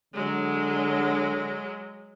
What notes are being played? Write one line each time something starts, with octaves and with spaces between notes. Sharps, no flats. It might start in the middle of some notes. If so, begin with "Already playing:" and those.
D3 F#3 G#3